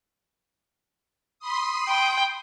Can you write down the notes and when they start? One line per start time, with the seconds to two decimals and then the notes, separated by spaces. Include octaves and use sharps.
1.39 B5 C6 D#6
1.88 G5